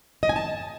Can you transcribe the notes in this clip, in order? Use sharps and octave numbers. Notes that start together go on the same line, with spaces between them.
D#5
G#5
A5